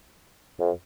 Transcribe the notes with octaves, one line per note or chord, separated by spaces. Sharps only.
F2